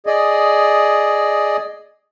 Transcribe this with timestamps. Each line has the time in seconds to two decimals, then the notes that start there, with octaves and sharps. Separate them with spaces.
0.07 G#4 D5 D#5